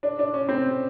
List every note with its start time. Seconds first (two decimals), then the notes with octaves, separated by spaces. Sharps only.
0.03 D4
0.19 D4
0.34 C#4
0.49 C4